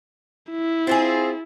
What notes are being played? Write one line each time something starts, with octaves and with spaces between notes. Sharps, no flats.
E4
C4 F4 F#4 G#4